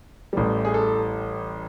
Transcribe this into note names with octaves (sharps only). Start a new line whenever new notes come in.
A1 A2 E3 G3
G#4
A4